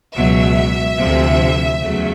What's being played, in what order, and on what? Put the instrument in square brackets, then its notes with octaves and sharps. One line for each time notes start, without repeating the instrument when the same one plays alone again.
[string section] C#2 B2 F#3 E5
D2 C3 F3
E2 C#3 F#3 A3